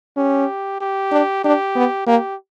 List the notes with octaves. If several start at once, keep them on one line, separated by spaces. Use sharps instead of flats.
C#4 G4
G4
D4
D4 G4
B3
A#3 G4